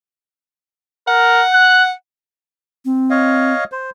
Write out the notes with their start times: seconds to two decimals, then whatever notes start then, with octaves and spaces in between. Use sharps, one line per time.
1.07 A#4 F#5
1.53 F#6
2.85 C4
3.10 C#5 D#5 F5
3.72 C5